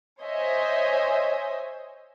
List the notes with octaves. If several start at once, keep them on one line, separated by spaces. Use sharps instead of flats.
C5 C#5 D#5 E5 G#5